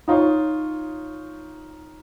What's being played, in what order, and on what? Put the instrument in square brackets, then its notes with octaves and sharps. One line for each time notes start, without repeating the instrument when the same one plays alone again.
[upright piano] D#4 F4 C#5